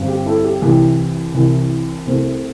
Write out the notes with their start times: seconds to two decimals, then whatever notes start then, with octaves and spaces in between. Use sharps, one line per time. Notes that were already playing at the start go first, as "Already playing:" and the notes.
Already playing: G1 G2 G3 C4
0.08 G4
0.26 E4 A4
0.44 G4
0.62 C2 C3 E3 G4
1.34 C2 C3 E3
2.07 C2 C3 A3 C4